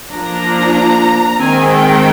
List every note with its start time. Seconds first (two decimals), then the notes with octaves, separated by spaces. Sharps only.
0.10 F3 A#3 D4 A#5
1.41 D#3 G#3 C4 G#5
1.73 G5